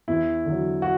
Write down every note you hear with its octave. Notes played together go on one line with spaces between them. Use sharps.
E2 E4
D3 F#3
F#4